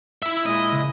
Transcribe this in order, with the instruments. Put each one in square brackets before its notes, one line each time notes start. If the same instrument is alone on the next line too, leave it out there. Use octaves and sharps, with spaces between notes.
[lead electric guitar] E4 E5
[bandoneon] A#2 G#3 E4 [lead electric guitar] D#5
[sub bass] C#3